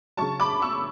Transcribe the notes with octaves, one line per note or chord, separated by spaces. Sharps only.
C#3 F#3 A5 C#6
B5 D6
C#6 E6